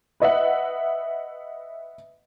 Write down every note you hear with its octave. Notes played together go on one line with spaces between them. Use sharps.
B4 D#5 E5 F#5